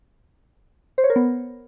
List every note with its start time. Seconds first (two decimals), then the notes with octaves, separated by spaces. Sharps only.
0.98 C5
1.04 C#5
1.10 A#4
1.16 B3